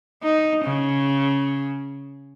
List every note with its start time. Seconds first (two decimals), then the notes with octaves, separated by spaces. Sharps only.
0.23 D#4
0.64 C#3